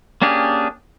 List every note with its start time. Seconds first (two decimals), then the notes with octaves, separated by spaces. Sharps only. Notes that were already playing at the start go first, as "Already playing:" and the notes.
0.22 A#3 C#4 D4 G4 G#4